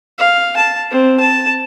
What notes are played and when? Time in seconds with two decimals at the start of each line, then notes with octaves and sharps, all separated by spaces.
0.18 F5
0.57 A5
0.91 C4
1.20 A5